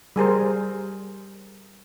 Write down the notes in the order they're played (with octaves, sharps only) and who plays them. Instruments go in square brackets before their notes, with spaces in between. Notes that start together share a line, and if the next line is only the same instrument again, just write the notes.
[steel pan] G3 G#4 A#4 C5